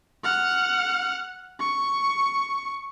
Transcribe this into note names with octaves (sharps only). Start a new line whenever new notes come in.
F#5 F6
C#6